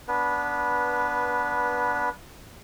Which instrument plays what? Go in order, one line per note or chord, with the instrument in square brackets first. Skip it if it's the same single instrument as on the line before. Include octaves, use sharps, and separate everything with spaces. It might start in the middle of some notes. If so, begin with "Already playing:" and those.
[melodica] B3 D4 B4